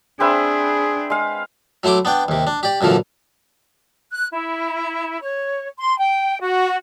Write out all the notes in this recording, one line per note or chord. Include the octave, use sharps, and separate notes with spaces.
C4 D4 G#4 B4 E5
G#3 F5
F#3 A3 E4 C6 D6
B3 D4 G5
D#2 C3
D4
G4 D5
F#2 A#2 D3 E3 F3
F#6
E4
C#5
C6
G5
F#4